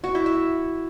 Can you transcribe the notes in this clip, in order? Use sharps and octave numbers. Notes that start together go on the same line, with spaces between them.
F#4
E4
E5